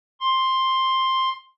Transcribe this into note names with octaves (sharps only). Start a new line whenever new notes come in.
C6